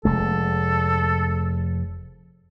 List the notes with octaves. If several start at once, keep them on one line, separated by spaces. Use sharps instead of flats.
F1 G#3 A4